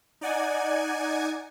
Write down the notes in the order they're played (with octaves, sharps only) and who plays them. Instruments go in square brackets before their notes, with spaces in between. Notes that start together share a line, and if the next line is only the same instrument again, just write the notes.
[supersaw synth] D#4 D5 F#5 G#5 G#6